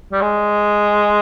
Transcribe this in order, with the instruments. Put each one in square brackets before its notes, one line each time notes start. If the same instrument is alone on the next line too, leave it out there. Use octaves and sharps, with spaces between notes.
[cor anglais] G3
G#3